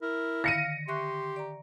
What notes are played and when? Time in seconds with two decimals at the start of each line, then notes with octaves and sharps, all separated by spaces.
0.02 E4 A#4
0.44 D3 D#3 F5 A#6 C#7 D#7
0.88 G4 E5 C6 C#6 F#6
1.36 D5 A#5